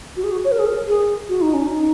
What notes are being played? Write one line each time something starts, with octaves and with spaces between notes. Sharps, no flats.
F#4
G#4
F#4
C#5
A#4
G#4
A#4
G#4
F#4
D#4
C#4
D#4